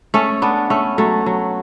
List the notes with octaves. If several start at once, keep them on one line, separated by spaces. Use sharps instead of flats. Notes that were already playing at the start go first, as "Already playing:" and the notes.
A3 C#4
B3 D4
A3 C#4
F#3 A3
F#3